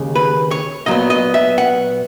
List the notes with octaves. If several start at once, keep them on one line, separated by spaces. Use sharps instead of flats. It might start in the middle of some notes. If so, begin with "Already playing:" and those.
Already playing: D#2 C#3 G#3
B4
C#5
A#2 F#3 B3 D#5
D#5
E5
F#5